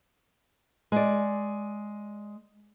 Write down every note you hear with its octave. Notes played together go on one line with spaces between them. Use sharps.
G#3 D5